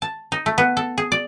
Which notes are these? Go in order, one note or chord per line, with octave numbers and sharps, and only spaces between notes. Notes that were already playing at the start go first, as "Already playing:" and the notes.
A5
D#4
A3
B3
A4
G#4
D5